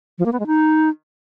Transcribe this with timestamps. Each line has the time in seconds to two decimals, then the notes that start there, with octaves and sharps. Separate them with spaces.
0.19 F3
0.26 A#3
0.33 B3
0.40 G#3
0.47 D#4